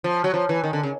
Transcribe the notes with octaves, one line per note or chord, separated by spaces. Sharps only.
F3
F#3
F3
E3
D#3
D3
C#3